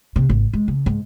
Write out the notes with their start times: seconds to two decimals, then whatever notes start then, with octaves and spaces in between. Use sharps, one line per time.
0.16 C3
0.29 G#1
0.53 G#3
0.68 C#3
0.86 G#2